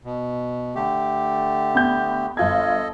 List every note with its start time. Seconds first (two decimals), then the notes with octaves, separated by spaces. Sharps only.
0.04 B2
0.75 D3 A3 G4
1.75 B3 G6
2.37 G1 F4 A4 D#5 G#6